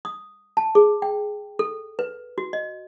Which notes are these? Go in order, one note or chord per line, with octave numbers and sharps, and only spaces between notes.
D#6
A5
G#4
G5
A4
B4
F#4
D#5